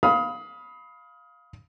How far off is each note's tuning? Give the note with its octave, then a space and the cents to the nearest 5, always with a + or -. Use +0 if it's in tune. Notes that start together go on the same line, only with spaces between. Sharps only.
F5 +5 B5 +0 D#6 +25